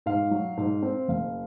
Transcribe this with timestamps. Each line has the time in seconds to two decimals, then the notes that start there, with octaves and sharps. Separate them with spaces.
0.06 G#2 F5
0.31 F#3
0.57 G#2
0.83 C4
1.08 F#1 F5